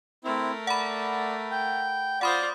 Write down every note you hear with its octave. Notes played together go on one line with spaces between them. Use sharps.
A3 C4 E4 A#4
D5 F#5 B5
G5
F4 C5 D5 F#5 B5 D#6